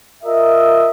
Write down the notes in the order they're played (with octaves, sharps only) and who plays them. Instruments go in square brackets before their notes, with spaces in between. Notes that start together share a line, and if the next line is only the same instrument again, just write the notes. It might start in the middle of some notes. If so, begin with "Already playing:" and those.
[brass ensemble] F4 A#4 D#5 E5